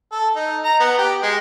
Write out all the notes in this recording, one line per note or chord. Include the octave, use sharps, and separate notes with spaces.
A4
D#4
A#5
B3
G4
G#3